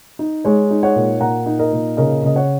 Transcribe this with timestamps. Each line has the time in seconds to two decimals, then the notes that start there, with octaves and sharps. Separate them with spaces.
0.19 D#4
0.45 G#3 C#5
0.71 D#4
0.83 C#5 F#5
0.96 A#2
1.21 A#2 F#5 A#5
1.46 D#4
1.59 A#4 D#5
1.73 A#2
1.97 C#3 A#4 D#5
2.24 C#3 D#5
2.36 C#5 F#5